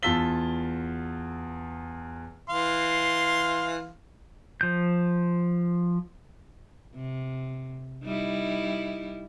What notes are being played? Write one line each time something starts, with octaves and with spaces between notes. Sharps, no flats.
E2 F4 A5 E6 B6 G7
E3 F5 C6
F3 G6
C3
G3 D#4 E4